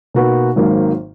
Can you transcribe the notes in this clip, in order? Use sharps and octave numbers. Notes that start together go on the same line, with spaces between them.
B2 A#3 D#4 F#4 B4
G#1 G#2 D#3 F#3 A#3